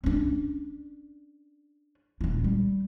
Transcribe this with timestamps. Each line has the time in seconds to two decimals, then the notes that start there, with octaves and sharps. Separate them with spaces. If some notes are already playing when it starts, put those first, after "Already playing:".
0.04 C#4 D4
2.21 D#1 F4
2.44 G3